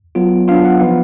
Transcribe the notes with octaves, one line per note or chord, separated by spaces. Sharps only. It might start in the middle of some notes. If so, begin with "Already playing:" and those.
F#3 B3 F4
F#3 B3 D4 F4 F5
F#5
F3 B3 D#4